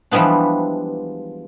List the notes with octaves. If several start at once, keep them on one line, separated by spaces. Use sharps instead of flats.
E3 F3 G3 G#3 B3 D4